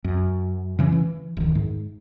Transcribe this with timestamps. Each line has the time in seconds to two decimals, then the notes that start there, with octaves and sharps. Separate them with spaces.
0.04 F#2
0.79 C#3 E3 G3 C#4
0.92 E3
1.37 D1 D#3
1.55 G#2